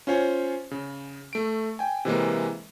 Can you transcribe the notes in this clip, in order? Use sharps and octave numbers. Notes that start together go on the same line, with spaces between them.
C#4 F4 C5 C#5 G#5
C#3
A3 D7
G5 G#5
C3 E3 G#3 A#3